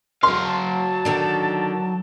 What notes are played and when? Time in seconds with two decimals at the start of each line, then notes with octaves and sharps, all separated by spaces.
0.23 F#3 F5 C6
0.44 A5
1.05 D3 D#3 D4